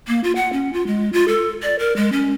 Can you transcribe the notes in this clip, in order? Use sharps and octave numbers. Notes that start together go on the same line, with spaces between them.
A#3
F4
F#5
C#4
F4
G#3
F4
A4
D5
A#4
G#3
C#4